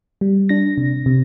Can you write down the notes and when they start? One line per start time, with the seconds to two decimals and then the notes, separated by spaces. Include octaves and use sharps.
0.21 G3
0.49 D4 A#6
0.78 C3
1.06 C3